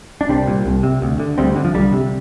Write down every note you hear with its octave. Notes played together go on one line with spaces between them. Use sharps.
D4
C2 G3 C4
A#2
C2
C3
D2
D3
D2 G3 C4
D3
F3
C2 D3 G3
C3